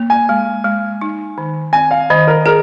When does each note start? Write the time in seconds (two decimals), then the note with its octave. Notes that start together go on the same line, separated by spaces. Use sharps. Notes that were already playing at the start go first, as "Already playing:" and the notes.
Already playing: A#3
0.10 G#5
0.29 G#3
0.64 G#3
1.01 D#4
1.38 D#3
1.73 C4 G#5
1.91 F5
2.10 D#3 D#5
2.28 A#4
2.46 G#4 A#4